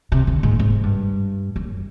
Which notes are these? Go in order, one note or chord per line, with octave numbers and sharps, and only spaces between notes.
C3
D3
G#2
G#2
G2
F#2